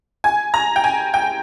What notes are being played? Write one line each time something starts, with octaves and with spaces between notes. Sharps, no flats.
G#5
A#5
G5
G#5
G5